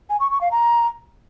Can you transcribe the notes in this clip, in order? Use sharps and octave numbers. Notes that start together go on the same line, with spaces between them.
G#5
C#6
C#6
F5
A#5